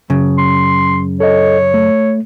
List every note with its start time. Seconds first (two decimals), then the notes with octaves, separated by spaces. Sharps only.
0.10 F#2 C#3
0.38 C6
1.20 A4 C#5 D#5
1.74 A3